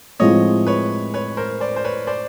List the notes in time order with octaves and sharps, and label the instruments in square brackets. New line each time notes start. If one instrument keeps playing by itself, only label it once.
[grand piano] A2 F3 G#3 C4 E4 [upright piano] C#5 D#5
[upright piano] B4 C#5
B4 C#5
A#4 C5
C5 D5
C5
B4 C#5
C5 D5